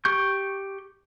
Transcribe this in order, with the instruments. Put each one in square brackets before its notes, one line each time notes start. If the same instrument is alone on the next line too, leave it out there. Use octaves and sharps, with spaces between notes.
[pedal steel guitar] G4 C#6 G6